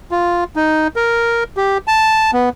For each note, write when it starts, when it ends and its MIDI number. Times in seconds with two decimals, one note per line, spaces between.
0.11 0.44 65
0.56 0.88 63
0.96 1.44 70
1.57 1.78 67
1.88 2.31 81
2.33 2.49 59